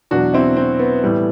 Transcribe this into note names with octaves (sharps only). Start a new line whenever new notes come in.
E2 B2 F#3 D4 F#4
C4 E4
C4
B3
A2 E3 G3 B3